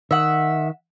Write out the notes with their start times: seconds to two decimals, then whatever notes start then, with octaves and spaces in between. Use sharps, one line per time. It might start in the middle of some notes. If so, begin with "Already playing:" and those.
0.11 D#3 E5 F#5